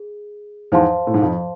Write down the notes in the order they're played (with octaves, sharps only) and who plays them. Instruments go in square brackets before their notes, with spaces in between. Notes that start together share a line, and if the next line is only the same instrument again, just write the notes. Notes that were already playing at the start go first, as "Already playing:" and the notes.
Already playing: [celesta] G#4
[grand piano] E2 G#2 [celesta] C5 F5 A5 C6
[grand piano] A2
G#2
F2